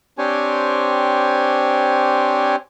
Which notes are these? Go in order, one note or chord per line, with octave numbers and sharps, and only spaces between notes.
C4 D4 G4 C5 C#5 G#5